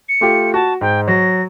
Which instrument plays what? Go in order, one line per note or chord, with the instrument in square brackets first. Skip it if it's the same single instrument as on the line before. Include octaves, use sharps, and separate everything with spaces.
[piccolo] C#7
[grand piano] A3 F4 G4
[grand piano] F#4 [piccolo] A5
[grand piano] G#2 [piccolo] G5
[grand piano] F#3 [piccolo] A#6